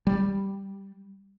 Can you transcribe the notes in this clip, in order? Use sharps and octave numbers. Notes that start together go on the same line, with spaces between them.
G3